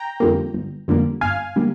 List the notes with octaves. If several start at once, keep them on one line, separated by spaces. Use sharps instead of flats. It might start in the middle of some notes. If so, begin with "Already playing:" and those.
Already playing: G5 A#5
F2 D3 G3 A#3
G1
F2 D3 G3 A#3
G1 F5 G#5
D3 G3 A#3